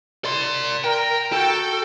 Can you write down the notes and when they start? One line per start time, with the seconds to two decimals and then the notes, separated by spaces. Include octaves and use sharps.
0.25 D5 C6
0.84 A#4 G5
1.33 F#4 A4 G5